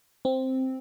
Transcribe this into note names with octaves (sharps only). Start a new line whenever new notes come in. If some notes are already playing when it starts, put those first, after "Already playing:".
C4